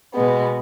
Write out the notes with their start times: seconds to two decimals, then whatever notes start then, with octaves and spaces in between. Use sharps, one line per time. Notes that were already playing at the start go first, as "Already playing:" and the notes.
0.13 B2 G#3 B3